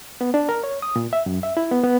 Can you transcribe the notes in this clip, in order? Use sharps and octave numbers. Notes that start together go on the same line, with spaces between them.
B3
D4
A#4
C#5
D#6
A#2
E5
F#2
E5
E4
B3
B3